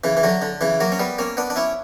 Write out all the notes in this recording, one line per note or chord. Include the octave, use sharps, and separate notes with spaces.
C#3 E3
E3
D3 F#3
D3
C#3 E3
F#3 A#3
C#4
G3 B3
A#3 C#4
B3 D4
D4
C#4 E4